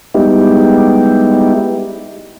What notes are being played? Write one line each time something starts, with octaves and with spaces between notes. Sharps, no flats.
G3 G#3 B3 D#4 E4 G4